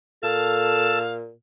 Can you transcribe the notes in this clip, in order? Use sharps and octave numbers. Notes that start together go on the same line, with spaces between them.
A#2 A4 F5 A5 E6